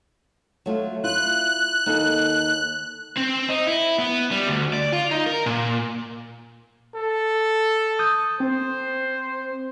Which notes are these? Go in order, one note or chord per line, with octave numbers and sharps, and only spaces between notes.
F#3 A3 F4
E4 F4 F#6
D#2 D#4 A4
C4
D#4
E4
B3
G3
D2
D5
F4
D#4
A#4
A#2
A4
D#6 G6
C4 C5